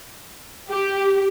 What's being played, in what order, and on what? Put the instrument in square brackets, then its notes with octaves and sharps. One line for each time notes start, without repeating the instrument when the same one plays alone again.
[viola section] G4